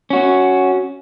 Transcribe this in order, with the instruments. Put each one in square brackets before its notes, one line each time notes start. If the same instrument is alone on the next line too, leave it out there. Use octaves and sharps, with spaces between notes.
[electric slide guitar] C#4 F#4